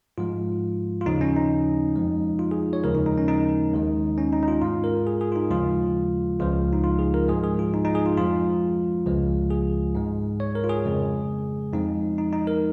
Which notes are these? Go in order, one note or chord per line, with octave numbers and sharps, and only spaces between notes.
G#2 F3 G#3 F4
F4
D#2 C#3 F3 D#4
C#4
D#4
F2 F3 G#3
F4
G#4
C#5
D#2 C#3 F3 G#3 A#4
D#4
D#4
C#4
D#4
D#2 D#3 G#3
C#4
D#4
D#4
F4
G#2 G#3 F4
A#4
G#4
G#4
F4
D#4
D#2 C#3 F3 G#3 F4
C#2 C#3 F3 G#3 F4
D#4
F4
G#4
A#4
G#2 F3 G#3 G#4
G#4
F4
D#4
D#4
G#4
F4
F2 F3 G#3 F4
C#2 C#3 F3 G#3
G#4
G#2 G#3
C#5
A#4
F4
G#4
F2 C#3 G#3
F2 F3 G#3 D#4
D#4
D#4
A#4